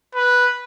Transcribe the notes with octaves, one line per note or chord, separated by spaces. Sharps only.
B4